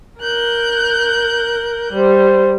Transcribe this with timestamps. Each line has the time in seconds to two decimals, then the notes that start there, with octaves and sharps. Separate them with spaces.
0.22 A#4 F#6 G6
1.93 G3 C5